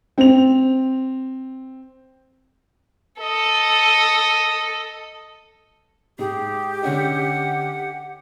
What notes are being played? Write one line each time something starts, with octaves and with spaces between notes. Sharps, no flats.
C4 F7
A4 D#5
G#2 G4 G#4
D3 C#4 D#4 F#5